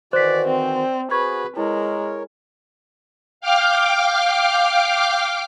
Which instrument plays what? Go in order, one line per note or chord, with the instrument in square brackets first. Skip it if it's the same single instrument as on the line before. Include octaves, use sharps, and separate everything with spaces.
[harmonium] D#3 E3 F#4 [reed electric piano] C5 [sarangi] D5 [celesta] F#6 B6
[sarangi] C4 [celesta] D5
[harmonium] F#4 G#4 [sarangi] B4 [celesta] C#6 G#6
[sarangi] G#3 [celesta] E4 [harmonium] A#4 C#5
[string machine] F5 G5 D6 F6